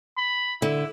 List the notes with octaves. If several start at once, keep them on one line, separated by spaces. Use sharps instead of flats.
B5
D3 E4